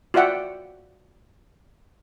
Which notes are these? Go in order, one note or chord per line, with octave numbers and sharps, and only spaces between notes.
F4 F#4 D5 E5 F#5 G5